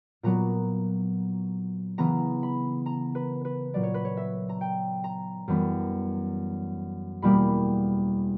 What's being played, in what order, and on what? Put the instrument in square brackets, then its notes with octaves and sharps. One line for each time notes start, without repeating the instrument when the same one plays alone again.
[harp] A#2 F#3 B3 A#5
C#3 E3 B3 A#5
B5
A#5
B4
B4
A#2 F#3 B3 D5
C#5
B4
C#5
E5
A#5
G5
A#5
F#2 E3 G3 B3
E2 B2 G3 A#3 B5